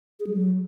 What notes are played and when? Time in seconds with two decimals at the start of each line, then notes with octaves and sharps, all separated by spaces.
0.20 G#4
0.27 G3
0.34 F#3